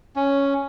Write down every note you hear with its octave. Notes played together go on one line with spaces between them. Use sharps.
C#4